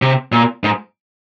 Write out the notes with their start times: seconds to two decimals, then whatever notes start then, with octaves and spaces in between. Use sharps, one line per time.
0.02 C3
0.32 A#2
0.64 G#2